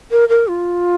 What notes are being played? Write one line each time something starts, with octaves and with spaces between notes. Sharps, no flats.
A#4
A#4
F4